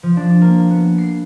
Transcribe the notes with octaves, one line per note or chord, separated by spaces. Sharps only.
F3
D4
A#3
B3
C7